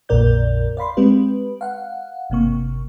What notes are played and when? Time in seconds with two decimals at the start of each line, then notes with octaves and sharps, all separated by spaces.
0.09 A#1 F2 A#2 A#4 D5 G6
0.77 D5 F5 B5 C6
0.97 G#3 C4 G4 B4
1.61 F5 F#5
2.30 G1 C3 A#3 C#6